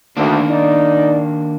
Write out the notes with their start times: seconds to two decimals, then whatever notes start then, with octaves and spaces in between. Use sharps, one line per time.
0.17 D2 D#3 A#3 D4
0.50 D#4 D5